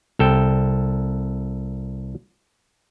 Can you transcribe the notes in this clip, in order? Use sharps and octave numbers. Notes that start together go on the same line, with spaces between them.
C2 A4 G5